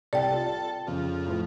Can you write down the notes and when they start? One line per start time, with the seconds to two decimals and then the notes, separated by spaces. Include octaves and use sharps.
0.13 C2 A4 D5 G5
0.33 F4
0.87 F2 C#3
1.27 A2 F3